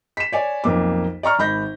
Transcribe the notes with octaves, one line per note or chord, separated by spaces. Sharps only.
B6 E7
C#5 D5 G#5
B1 F2 A#3 D6
D5 A#5 C#6 F6
G#1 B5 G6 A#6